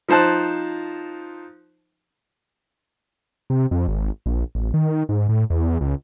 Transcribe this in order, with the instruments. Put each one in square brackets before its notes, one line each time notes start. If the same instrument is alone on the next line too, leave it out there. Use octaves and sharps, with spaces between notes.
[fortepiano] F3 D#4 C5 A5 F#6
[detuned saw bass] C3
F2
G#1
A#1
A1
D#3
G#2
A2
E2
C#2